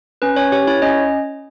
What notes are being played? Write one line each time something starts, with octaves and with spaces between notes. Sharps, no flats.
C#4 B4
C#4 C#5
G4 C#5
E4 C#5
C#4 D#5